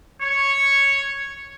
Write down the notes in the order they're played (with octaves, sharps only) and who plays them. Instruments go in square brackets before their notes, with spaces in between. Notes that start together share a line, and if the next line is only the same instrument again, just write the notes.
[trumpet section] C#5